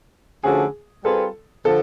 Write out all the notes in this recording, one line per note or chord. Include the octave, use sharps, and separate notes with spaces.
D3 F3 A3 C#4 F#4 G#4
G3 C4 F4 G#4 A4 B4
D3 F3 A4